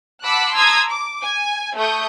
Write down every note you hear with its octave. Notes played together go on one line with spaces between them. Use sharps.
F#5 A5 B5 D6 E6 F#6
A5 A#5 C6 D#6 E6 G#6
D6
G#5
A3 C#6 D#6 G6